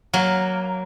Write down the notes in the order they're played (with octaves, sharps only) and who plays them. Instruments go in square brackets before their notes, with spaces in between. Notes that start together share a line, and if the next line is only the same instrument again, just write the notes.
[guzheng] F#3 A#3